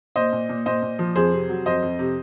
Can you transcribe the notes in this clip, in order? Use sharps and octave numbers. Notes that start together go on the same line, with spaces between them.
A#2 C5 D#5
A#2
A#2
A#2 C5 D#5
A#2
F3
F2 G#4 C5
C3
F#3
F2 C5 D#5
F2
C3